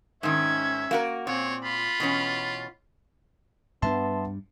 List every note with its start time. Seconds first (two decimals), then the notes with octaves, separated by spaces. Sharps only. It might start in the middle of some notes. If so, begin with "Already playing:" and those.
0.23 G#2 D#3 C#4 E5 G#6
0.91 A#3 F#4 A#4
1.27 A#2 C4 C#5
1.64 F4 B5
2.00 B2 E3 C#4
3.82 G2 G3 B3 D4 E5 A5 C6